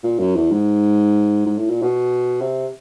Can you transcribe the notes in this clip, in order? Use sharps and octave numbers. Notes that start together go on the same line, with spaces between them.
A#2
F#2
E2
G#2
G#2
A2
A#2
B2
C3